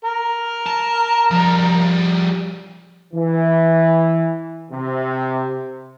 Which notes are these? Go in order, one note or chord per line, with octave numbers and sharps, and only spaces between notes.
A#4
A5
F3 G3
E3
C3